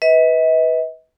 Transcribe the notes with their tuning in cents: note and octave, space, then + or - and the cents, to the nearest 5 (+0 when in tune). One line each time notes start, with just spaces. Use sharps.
B4 +0 D#5 +45